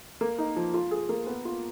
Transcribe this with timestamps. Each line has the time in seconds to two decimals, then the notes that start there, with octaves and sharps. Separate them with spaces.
0.21 A#3
0.38 D#4
0.56 F3
0.74 F4
0.91 G#4
1.09 A#3
1.27 B3
1.45 F4